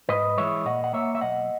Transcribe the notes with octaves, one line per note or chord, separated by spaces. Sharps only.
G#2 B4 D#5
E3 G#3 C#5 E5
A#2 D#5 F#5
F#5
A#3 C#5 E5
E5
B1 D#5 F#5